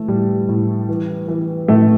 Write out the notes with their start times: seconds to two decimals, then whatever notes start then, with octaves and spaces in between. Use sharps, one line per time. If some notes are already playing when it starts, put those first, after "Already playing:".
Already playing: E3 A3
0.08 A2 G3
0.49 A2
0.89 E3
1.28 E3
1.68 A2 A3